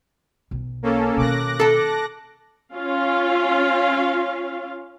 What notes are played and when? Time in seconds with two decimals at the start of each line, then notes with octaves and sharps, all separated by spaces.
0.51 B1
0.83 A#3 C#4 A4
1.17 B2 D#3 D6 F#6 A#6
1.60 A4 A5
2.74 C#4 F4 F5